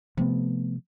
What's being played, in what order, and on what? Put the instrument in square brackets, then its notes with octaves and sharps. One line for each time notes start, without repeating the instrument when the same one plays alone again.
[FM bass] C3 [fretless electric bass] F3 A3 B3